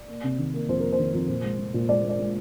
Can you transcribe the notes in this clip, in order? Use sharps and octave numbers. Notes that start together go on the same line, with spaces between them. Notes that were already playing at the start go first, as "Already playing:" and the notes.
Already playing: D5
A#3
C3
D#3
A#3
F2 C5
A#3 A#4
C5
D#3
F2
A#2
G#3
G#3
A#2
G#3 D5
G#3
D5
G#3